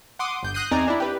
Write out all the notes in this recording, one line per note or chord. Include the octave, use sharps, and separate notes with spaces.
F#5 C6 D6 D#6
G1 G6
D#6 F#6 G6 A#6 C7 D#7
E2 C4 D#4 D5 G#5 A#5
D4 E4
G4 B4